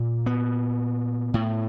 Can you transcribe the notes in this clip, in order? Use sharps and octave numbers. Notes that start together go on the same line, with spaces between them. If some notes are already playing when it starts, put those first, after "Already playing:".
Already playing: A#2
B3
A2